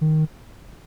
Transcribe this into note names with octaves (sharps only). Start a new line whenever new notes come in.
D#3